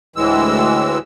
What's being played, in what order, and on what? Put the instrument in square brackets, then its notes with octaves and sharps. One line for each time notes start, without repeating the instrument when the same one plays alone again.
[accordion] D2 A2 E3 G#3 E6